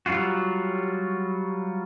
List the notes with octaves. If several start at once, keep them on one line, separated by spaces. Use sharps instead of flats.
F#3 G3 F4 F#4